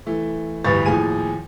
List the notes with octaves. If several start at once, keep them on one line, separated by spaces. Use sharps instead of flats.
E3 A3
A1 D2 G2 B4 C#6 A6
D#2 A2 F3 G#4 G#5 D#7